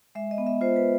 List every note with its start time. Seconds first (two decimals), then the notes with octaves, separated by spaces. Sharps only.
0.15 G#3 E5
0.31 D#5
0.38 B3
0.47 E5
0.61 F4 C5
0.76 B4